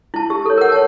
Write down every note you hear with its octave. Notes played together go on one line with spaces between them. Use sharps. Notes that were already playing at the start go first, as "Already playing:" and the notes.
E4 A5
G4
A4 C#5
A#4 F#5
C#5 A5